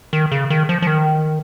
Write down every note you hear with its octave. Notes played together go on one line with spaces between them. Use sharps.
D#3
C#3
D#3
F3
F3
D#3